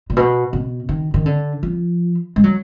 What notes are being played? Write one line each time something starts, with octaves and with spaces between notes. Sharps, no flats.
A#2
B2
B2
D#3
D#3
D3
F3
G#3
F#3